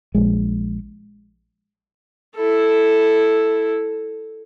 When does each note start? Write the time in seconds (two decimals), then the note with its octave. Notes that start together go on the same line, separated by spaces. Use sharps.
0.15 A#1 G#3
2.36 E4 A4